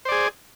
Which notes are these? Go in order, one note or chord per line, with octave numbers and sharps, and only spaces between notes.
G#4 C5 D5